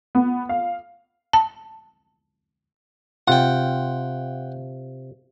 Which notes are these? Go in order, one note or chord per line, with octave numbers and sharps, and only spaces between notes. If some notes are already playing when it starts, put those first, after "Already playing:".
B3
F5
A5
C3 F4 F#5 G5